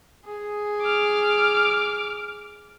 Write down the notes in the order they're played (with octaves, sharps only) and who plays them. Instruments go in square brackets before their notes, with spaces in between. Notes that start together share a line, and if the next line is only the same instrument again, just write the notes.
[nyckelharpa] G#4
[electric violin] D6 F6